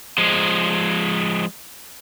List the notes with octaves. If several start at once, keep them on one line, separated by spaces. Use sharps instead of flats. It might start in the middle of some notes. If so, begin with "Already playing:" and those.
F3 G#3